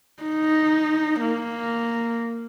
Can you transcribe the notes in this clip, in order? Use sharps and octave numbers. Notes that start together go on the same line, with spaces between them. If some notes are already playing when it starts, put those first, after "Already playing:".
D#4
A#3